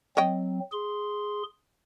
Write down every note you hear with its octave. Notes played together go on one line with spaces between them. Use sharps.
F#3 C4 C#5 D#5 G5
G#4 C6